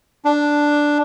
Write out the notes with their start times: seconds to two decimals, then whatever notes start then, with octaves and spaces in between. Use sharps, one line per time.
0.25 D4